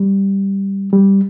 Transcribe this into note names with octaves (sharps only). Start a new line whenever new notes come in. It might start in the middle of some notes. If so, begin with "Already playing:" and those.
Already playing: G3
G3